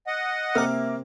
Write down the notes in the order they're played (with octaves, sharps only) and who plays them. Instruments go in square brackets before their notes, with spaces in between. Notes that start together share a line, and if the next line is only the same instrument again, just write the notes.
[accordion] D#5 F#5
[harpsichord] C3 D6 [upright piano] A#3 A#4 [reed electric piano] E5 F6